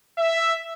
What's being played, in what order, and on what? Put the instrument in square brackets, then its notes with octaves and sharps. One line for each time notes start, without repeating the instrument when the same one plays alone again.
[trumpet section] E5